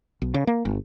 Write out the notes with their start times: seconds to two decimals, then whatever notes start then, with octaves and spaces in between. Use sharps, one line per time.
0.22 B1
0.34 C#3
0.47 A#3
0.65 G1